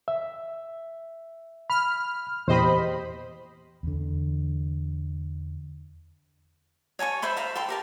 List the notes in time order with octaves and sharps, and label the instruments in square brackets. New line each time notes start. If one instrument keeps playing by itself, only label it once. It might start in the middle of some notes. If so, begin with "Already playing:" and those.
[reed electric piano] E5
[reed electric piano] B5 [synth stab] F6
[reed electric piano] E2 A#2 G4 [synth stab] C5 D#5 B5
[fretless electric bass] E2 D3
[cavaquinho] C#5 G#5 A5 C#6
C5 E5 B5 C6
E5 F5 A#5
A4 G5 C6
G4 A#4 A5